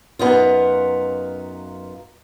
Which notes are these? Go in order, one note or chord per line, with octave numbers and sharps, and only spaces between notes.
F#2 B3 D#4 F4